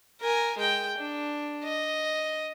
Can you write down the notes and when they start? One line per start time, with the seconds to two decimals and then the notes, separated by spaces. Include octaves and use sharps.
0.21 A#4 G#5
0.58 G#3 G5
0.97 D4
1.64 D#5